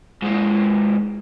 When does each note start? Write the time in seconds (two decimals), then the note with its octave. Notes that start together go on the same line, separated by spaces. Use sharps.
0.22 G#2 A#3